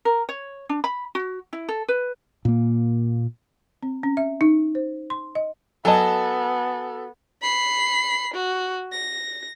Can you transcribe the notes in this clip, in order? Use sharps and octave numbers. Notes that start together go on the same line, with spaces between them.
A#4
C#5
D4
B5
F#4
E4
A4
B4
A#2 A#3
C4
C#4
E5
D#4
C5
C6
D#5
F#3 B3 A4 D#5 G#5 A5
B5 C7
F#4
A#6